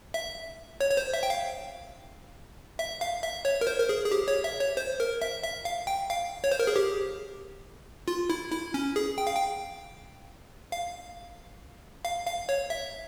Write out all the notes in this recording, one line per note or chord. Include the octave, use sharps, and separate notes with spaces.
E5
C#5
C#5
C5
E5
G5
F5
E5
F5
E5
C#5
A#4
C5
A#4
G#4
G#4
G4
C#5
E5
C#5
C5
A#4
E5
E5
F5
G5
F5
C#5
C5
A#4
G#4
G4
F4
E4
E4
C#4
G#4
G5
F5
G5
F5
F5
F5
C#5
E5